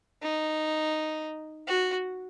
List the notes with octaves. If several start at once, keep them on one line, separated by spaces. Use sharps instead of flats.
D#4
F#4